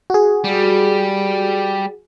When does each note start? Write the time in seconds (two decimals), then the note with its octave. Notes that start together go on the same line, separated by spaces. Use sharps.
0.10 F#4 G#4
0.44 G3